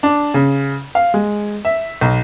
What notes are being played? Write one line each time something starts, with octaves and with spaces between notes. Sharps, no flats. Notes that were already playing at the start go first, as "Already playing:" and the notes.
D4
C#3
F5
G#3
E5
B1